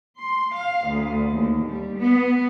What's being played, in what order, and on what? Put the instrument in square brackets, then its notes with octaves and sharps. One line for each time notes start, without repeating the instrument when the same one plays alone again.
[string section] C6
F5
D2
D#2
G3
B3